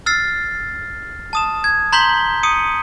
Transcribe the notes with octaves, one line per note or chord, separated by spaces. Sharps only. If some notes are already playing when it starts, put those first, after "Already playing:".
E6 F6 A6 C7
A5 D#6 E7
G#6
A#5 C6 G6 B6 F#7 G7
D#6 C#7 D#7